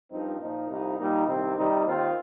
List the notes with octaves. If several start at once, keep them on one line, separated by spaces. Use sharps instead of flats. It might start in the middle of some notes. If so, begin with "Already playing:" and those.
G2 F3 C4 D#4
A#2 F3 D#4
C2 C3 F3 D#4
A#2 G3 A#3 D#4
C2 C3 D#3 C4
C3 D#3 G3 C4 D#4
D#2 D#3 C4 F4